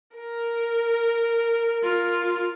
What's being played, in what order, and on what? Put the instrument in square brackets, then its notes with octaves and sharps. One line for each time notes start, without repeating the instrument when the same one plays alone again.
[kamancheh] A#4
[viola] F4